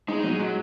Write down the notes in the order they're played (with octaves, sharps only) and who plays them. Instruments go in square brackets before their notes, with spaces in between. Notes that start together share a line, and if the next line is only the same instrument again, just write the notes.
[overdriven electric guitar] G#3 [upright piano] D#4
[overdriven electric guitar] D#4
[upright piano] F#3
[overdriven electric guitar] G#3
[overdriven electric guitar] F#3 [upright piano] G#3